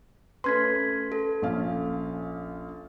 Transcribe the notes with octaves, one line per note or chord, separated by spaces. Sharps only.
A3 C#4 B4 C6 G#6 B6
A4
A#1 C#4 F5